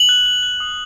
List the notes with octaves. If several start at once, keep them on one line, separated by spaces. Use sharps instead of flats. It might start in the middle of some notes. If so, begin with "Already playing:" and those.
Already playing: F#7
F#6
F#6
F#6
D#6